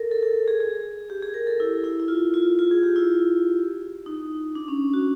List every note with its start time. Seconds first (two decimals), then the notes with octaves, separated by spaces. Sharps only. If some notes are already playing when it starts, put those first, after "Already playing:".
Already playing: A4 A#4
0.11 A4
0.23 A4
0.48 G#4
0.60 G#4
1.10 G4
1.23 G#4
1.34 A#4
1.47 A4
1.60 E4
1.84 E4
2.00 E4
2.08 F4
2.34 F4
2.59 F4
2.71 G#4
2.83 G4
2.96 E4
4.06 D#4
4.55 D4
4.68 C#4
4.94 F#4